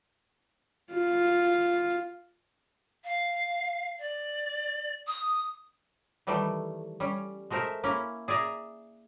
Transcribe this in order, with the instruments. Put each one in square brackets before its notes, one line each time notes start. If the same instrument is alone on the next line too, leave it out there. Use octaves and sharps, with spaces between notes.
[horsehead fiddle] F4
[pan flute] F5
D5
D#6
[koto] D#3 E3 G3 A3
G3 C#4
G#3 A3 A#4 C5 E5
A#3 C#4 E4
G#4 D5 E5 A#5